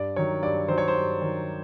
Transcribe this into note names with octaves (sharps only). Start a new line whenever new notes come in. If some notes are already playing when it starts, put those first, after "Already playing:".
Already playing: G2 D5
D#3 F#3 C#5
G2 D5
D#3 F#3 C5
C#5
C5
G2
D#3 F#3